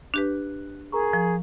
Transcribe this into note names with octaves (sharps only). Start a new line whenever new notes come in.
D4 G4 B4 F#6
G#4 A#4 A#5 C#6
F3